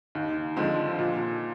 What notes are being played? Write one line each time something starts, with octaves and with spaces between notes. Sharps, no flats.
D#2
D3 F3 G#3 C4
A#2